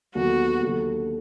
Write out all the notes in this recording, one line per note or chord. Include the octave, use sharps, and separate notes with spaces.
D#2 D3 F#3 B3 F#4
D#2 D3 F#3